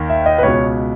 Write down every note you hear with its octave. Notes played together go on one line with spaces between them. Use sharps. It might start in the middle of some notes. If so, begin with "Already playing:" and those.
Already playing: D#2 D#3
E5
D#5
B4
C#2 B2 C#5